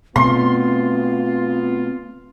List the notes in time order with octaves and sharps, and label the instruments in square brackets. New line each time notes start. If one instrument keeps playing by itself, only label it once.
[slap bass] B2 A3 [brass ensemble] B3 F4 [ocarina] C4 [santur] C6